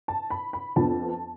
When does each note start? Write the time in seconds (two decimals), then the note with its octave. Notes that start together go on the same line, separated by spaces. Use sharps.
0.08 A5
0.30 B5
0.53 B5
0.76 F2 F3 B3 D4 A5